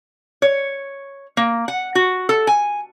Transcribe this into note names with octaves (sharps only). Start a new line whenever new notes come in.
C#5
A#3
F#5
F#4
A4
G#5